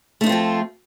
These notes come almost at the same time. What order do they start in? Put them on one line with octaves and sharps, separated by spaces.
A3 D#4 F4 C4 F3